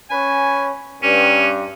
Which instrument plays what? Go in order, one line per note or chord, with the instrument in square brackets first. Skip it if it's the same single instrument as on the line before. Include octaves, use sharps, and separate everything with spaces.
[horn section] C#4 B4 G#5
[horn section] G2 [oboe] C#4